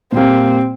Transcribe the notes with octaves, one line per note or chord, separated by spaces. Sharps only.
A#2 G3 A#3 C4